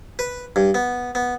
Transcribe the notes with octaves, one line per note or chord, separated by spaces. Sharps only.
B4
G2
B3
B3